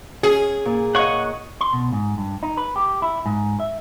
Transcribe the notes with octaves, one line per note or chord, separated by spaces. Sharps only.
C#4 G#4
A#2
C#5 D#5 F5 F#5 C#6
C6
B2
G#2
G2
D#4
B4
G4
E4
G#2
E5